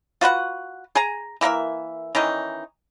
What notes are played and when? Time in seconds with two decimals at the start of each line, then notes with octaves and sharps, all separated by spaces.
0.21 F4 F#4 B4 F#5
0.95 G#4 G#5 A#5
1.41 E3 A#3 A#4 E5
2.15 D#3 E3 C#4 D#4